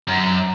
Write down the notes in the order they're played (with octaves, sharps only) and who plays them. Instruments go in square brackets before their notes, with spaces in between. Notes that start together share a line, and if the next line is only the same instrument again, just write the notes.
[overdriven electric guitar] F#2